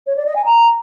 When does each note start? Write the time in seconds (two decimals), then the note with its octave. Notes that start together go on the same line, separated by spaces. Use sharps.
0.06 C#5
0.16 D5
0.25 D#5
0.35 G#5
0.45 A#5